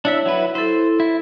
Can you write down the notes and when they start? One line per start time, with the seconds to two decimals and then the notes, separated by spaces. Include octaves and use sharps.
0.05 D4 E4 C#5 E5
0.26 F#3 E4 B4
0.55 E4 A4 C5
1.00 E4